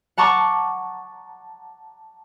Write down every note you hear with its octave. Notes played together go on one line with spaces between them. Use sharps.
F#5 A5 A#5 C#6 D6